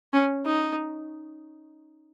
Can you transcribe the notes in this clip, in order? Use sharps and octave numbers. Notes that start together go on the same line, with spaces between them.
C#4
D#4